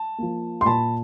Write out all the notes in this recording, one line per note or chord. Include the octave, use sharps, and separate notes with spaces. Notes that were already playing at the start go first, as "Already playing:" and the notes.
Already playing: A5
F3 A#3
C6
A#2 A5 B5